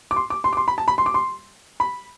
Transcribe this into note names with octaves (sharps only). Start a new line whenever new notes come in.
D6
C6
D6
C6
D6
C6
B5
A5
B5
C6
D6
C6
B5